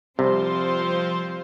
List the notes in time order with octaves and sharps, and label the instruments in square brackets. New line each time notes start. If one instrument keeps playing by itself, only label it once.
[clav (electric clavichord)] C2 C3 [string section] F3 C4 F4 C5